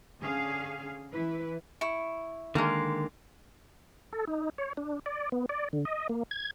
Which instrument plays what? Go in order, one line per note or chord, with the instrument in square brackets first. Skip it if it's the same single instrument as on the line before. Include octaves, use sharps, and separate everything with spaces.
[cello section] D3 C#4 G#4 F5
E3 E4 B4
[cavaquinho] E4 C#6
[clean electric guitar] D3 D#3 [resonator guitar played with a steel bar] G#3 A#3
[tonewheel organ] A4
D#4
C#5
D4
D5
B3
D5
D3
D#5
A#3
G#6